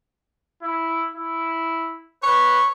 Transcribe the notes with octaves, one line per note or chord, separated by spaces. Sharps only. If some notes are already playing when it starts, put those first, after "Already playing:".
E4
E4
B4 C#5